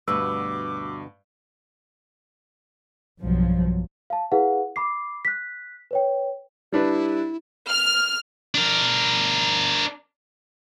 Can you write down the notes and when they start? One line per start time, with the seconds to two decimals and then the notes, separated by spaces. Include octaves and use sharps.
0.08 D2 G2 B2 B4 D6 E6
3.19 B1 G2 F3 F#3
4.10 F5 A5
4.32 E4 G#4 B4 F5 F#5
4.76 B5 D6 C7
5.25 F#6 B6
5.91 B4 C#5 G5
6.72 G3 D4 E4 B4
7.69 F6
8.55 D4 A#4